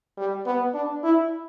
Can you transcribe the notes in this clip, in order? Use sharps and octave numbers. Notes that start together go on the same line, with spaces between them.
G3
B3
D4
E4